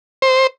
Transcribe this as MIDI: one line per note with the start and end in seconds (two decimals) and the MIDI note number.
0.22 0.47 72